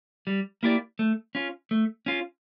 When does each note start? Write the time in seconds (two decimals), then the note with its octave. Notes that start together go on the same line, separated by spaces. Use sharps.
0.27 G3
0.63 A#3 E4 G4 D5
0.99 A3
1.35 C#4 F4
1.71 A3
2.06 C#4 F4